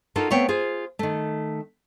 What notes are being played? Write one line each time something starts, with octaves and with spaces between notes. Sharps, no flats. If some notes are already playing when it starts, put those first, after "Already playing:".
D#4 F4 F#4 A4 A#4
A3 B3 C4 C#5 F5 G5
F4 G#4 C5
D#3 A3